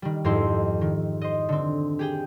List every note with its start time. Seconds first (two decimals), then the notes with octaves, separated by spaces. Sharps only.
0.02 D#3 G3
0.24 F2 G#2 D#4 E4 G4 C6
0.81 D#3
1.21 C5 D#5
1.49 D3 C4
1.99 G4 G#4 G5